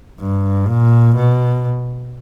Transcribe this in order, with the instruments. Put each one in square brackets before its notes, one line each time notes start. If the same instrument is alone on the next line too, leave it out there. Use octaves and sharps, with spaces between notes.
[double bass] G2
A#2
B2